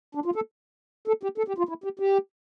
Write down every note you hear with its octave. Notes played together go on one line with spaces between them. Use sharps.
D4
F4
A4
A4
G4
A4
G4
F4
E4
G4
G4